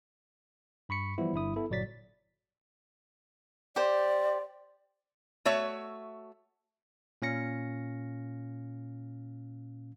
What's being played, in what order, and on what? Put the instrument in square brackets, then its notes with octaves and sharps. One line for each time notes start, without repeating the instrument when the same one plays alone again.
[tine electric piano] G2 B5 C#6 B6 C#7
E3 F3 G3 B3 E4
G1 G2 E4 D#6
B3 E4 A4
G1 A#2 F#3 D5 A6 B6
[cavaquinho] G4 C5 [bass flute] D5
[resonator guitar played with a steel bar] A3 F#4 C#5 E5
[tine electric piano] A#2 C#4 F5 A#6 C#7